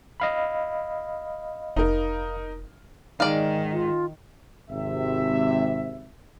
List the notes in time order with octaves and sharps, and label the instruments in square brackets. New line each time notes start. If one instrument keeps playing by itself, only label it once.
[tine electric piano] D#5 F5 B5
[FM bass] F1 [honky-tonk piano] D#4 A#4
[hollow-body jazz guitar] G#2 G#3 D#4 [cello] D#3 [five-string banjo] D5 F5
[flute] F4
[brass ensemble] G#1 C3 E5